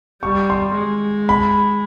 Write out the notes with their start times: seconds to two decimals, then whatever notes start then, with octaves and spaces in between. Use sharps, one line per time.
0.23 G3 C#6
0.50 C6
0.77 G#3
1.29 B5